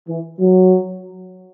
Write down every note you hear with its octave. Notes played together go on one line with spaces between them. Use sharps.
E3
F#3